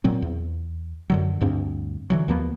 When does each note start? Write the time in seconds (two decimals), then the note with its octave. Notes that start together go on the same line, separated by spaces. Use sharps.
0.04 A#2 F#3 C4
0.22 E2
1.10 F#2 D3 F#3
1.41 D2 G2 C4 D4
2.10 D3 E3 F#3
2.28 D#2 F3 A#3 B3